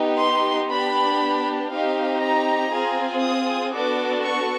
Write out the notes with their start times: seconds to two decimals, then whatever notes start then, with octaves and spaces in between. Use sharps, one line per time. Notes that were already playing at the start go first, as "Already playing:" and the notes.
Already playing: B3 D#4 G4
0.20 C6
0.71 B3 D4 G4 B5
1.71 C4 D#4 G4 F5
2.22 A#5
2.72 C4 F4 G#4
3.22 D#6
3.73 B3 D4 F#4 A4 D6
4.23 C#6